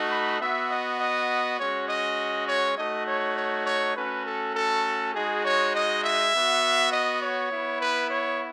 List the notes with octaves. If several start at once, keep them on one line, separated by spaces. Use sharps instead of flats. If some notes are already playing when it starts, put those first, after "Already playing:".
Already playing: A3 D#4 F#4
B5
B3 F#4 E5
D#5
D#5
G#3 C#4 F#4 C#5
D#5
C#5
A3 D#4 F#4 D#5
C#5
C#5
C#5
A3 C#4 F#4 B4
A4
A4
G#3 D#4 F#4 G#4
C#5
D#5
E5
B3 F#4
D#5
C#5
B3 E4
B4
C#5